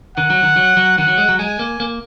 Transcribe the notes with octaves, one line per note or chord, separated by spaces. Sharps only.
D#3 F#5
F#3
D#3
F#3
F#3
D#3 F#5
F#3
G#3
F#3
G#3 G#5
A#3
A#3